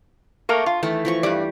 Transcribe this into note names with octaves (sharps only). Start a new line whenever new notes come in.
A3 A#3 A#4
F4
D#3 E3 A3 A5
E3 F3 C#6
G2 G3 D5